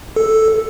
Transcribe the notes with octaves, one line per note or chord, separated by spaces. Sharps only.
A4